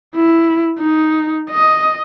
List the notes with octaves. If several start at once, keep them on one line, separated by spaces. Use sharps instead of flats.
E4
D#4
D#5